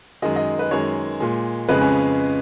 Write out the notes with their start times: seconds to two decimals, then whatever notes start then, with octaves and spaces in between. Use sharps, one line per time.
0.22 F#2 D#3 G#3 D#5
0.36 D#5
0.59 B4
0.71 F#2 D#3 G#3 C#5
1.20 A#2 G#3
1.69 F2 C#3 G#3 B4
1.81 C#4